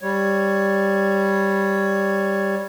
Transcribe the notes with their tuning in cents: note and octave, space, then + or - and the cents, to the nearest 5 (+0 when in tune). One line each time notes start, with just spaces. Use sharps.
G3 +5 C#5 +0